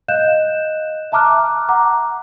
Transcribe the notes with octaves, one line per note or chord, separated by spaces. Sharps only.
D#5 F5 F#6 G6 E7
E5 A5 A#5 D6 F6 F#6
F#5 A#5 D6